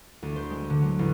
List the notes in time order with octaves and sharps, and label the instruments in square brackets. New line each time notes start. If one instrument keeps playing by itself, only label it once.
[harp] D2
C5
G#3
D3
F#3
A1